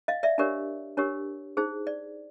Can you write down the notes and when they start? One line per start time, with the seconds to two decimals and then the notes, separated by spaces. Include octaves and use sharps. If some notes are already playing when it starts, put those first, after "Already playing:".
0.08 D#5 F5
0.23 D5 E5
0.38 D4 G4 A#4 C#5 D5
0.97 D4 G4 A#4 C#5
1.57 D#4 G#4 C5
1.87 D5